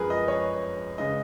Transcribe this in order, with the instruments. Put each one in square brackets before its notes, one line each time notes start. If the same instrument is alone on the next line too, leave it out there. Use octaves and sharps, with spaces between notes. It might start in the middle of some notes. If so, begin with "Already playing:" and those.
Already playing: [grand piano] F#2 F3 G#3 G#4 A#4 B4
D#5
C#5
C#3 G#3 D#5